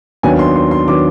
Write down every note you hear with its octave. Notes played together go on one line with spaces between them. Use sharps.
D#2 D#3 F#3 B3 D4 G#5
C6
C6
C6
D#3 F#3 B3 D4 D6